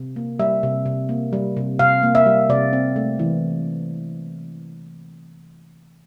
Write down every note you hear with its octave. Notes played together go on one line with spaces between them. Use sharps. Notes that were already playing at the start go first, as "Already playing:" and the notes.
Already playing: C3
A#3
G3 E5
C3
C3
A#3
G3
C3
C3 F5
A#3
E5
G3
C3 D5
C4
A3
E3